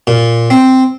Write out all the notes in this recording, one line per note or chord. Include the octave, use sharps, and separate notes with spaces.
A#2
C4